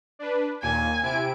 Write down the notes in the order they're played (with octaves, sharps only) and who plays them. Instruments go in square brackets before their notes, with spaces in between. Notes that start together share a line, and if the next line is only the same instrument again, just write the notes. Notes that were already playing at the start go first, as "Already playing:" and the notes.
[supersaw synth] D4 B4
[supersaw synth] D#2 A#2 [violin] G#5
[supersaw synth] C3 E4 D7